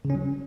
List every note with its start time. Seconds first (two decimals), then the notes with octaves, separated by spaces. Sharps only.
0.05 C#3
0.10 C#4
0.15 F#3